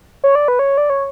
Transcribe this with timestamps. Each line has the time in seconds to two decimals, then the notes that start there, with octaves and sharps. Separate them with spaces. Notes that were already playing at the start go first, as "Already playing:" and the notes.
0.24 C#5
0.35 D5
0.48 B4
0.59 C#5
0.78 D5
0.90 C#5